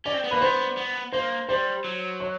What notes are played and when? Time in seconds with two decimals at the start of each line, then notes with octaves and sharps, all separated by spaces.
0.05 C#4 D5
0.14 C4
0.24 B3
0.31 A#3 B4
0.41 B3 C5
0.77 B3
1.12 A#3 C5
1.49 G3 C5
1.84 F#3
2.20 C#5